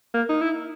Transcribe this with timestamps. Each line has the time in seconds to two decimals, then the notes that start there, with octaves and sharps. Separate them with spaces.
0.14 A#3
0.29 D#4
0.41 E4